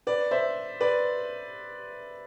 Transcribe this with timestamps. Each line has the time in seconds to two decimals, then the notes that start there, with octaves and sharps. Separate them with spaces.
0.07 B4 D5
0.31 C5 E5
0.81 B4 D5